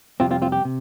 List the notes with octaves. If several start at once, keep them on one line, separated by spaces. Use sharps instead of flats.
F2 C3 G3 C4 F4
C4 F4
C4 F4
G4
C3